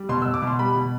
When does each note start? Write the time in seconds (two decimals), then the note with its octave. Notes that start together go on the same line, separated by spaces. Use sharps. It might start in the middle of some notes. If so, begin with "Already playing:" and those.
Already playing: G3
0.09 B2 C6
0.22 E6
0.26 B2
0.34 D6
0.42 B2
0.47 C6
0.59 G3 B5
0.76 B2